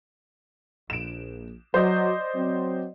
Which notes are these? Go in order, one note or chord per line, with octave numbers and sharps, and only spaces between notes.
A#1 D7 E7
F#3 C5 D5 D#5
F#3 C4